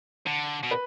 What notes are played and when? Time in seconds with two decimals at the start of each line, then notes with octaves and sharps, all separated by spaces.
0.27 D3
0.63 B2
0.71 B4